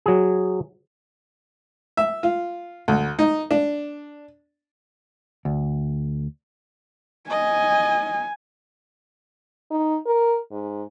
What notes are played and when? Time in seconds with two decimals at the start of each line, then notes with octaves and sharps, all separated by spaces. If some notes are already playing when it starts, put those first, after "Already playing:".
0.06 F#3 G#4
1.97 E5
2.23 F4
2.88 D2
3.19 D#4
3.51 D4
5.45 D2
7.30 D#5 G#5
9.71 D#4
10.07 A#4
10.51 G#2